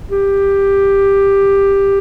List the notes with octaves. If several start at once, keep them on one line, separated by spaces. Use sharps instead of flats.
G4